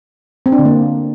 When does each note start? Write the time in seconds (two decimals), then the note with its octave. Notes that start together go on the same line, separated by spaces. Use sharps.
0.46 C4
0.52 D4
0.59 D3
0.65 A#3